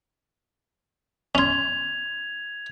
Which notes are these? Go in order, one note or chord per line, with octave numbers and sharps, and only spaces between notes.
C#4 C6 G#6 F7